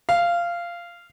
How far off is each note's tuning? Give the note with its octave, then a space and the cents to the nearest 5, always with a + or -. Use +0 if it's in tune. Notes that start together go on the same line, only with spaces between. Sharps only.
F5 -15